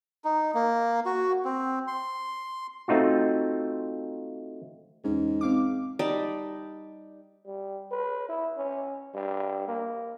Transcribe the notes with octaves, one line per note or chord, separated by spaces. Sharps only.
D#4
A#3
F#4
C4
C6
A3 C4 D#4 F4 F#4
E2 G#2 C#4
C4 F5 D6
G3 D#4 D5 A5
G3
B4
E4
C#4
G2
A#3